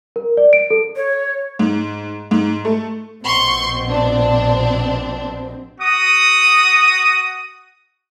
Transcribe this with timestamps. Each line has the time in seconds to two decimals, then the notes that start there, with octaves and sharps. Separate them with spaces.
0.16 A#4
0.37 D5
0.53 D7
0.71 A4
0.96 C#5
1.59 G#2
2.31 G#2
2.65 A3
3.24 A#1 B2 C4 C6 C#6
3.89 D4
5.81 F#4 D#6